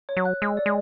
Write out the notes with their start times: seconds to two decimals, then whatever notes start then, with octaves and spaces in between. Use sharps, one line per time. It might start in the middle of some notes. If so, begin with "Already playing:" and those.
0.09 C#5
0.17 F#3
0.25 F#6
0.42 G#3 E6
0.57 D5
0.66 G#3